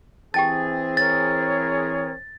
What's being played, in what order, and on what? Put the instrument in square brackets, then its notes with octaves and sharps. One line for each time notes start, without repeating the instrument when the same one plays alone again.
[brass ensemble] E3 C4 G#4 [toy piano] G4 G5 A5 [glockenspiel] A6
[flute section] A#4 C#5 [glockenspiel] A6